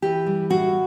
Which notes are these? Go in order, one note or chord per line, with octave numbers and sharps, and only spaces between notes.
E3 G4
G3
A2 F#4